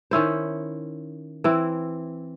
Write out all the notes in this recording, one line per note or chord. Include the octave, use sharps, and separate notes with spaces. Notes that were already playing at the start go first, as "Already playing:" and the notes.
D#3 C#4 E4 C5
E3 C4 E4